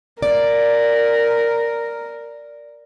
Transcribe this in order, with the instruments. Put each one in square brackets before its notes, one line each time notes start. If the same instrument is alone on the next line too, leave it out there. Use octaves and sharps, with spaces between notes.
[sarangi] A#4 [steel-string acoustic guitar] D5